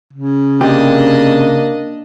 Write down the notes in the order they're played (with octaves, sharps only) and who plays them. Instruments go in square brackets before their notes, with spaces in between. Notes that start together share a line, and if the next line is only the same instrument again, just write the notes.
[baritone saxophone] C#3
[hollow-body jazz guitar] C3 G4 [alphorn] A#3 [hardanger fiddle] D4 D#5